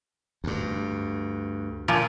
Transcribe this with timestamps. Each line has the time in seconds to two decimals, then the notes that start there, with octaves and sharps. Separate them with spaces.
0.44 D2 G2
1.88 A#2 F3